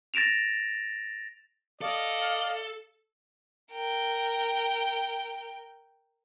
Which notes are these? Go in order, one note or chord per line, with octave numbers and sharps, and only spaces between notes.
A6 A#6 D7 E7 F7
A4 D5 D#5 F5
A#4 G5